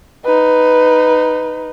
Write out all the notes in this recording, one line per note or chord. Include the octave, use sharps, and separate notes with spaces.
D#4 B4